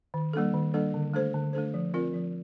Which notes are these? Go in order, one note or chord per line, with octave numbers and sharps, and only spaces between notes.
D#3
G3 A#3 D4 A4
D#3
G3 A#3 D4 A4
D3
A3 D4 A4 C5
D3
A3 D4 A4 C5
F3
C4 F4 A#4 D5
F3